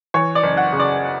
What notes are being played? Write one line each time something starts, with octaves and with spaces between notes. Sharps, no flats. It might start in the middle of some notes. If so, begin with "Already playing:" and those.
E3 C#5
D5
F#1
F#5
C#3
D5